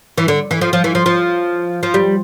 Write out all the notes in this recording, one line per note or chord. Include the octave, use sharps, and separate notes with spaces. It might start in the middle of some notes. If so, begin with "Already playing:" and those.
E3
D3
E3
F3
F3
E3
F3
F3
F3
G3